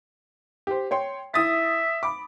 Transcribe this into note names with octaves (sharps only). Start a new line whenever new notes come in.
G4 C5
C#5 G5 C6
E4 E5 D#6 A6
B5 D6